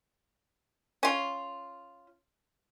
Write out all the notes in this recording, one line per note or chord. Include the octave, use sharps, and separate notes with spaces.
C#4 F4